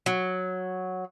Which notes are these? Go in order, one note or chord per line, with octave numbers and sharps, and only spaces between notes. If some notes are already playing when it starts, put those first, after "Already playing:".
F#3